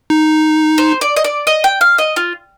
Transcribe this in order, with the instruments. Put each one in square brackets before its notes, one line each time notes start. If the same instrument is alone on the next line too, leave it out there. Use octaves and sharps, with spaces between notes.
[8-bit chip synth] D#4
[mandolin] C5
D5
D#5
D5
D#5
G5
F5
D#5
F4